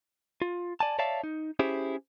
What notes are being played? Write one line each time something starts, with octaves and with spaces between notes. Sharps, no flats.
F4
D5 G#5 A5
C#5 D5 E5 F5 A5
D#4
C#4 E4 G4 G#4 C5